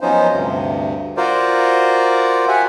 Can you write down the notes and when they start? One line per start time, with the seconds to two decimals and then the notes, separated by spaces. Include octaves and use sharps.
0.01 F3 F#3 B3 C#4 D#4 C5
0.33 D2 G2 C3
1.17 F4 F#4 A#4 C5 D5
2.48 G4 E5 F#5 G#5